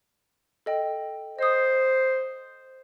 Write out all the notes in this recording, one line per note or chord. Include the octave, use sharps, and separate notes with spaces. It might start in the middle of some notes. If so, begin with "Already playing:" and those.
A4 D#5 G5
C5 D#5 D#6